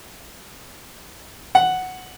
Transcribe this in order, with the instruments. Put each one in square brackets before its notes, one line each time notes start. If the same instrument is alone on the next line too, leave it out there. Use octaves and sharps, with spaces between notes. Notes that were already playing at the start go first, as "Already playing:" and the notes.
[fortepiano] F#5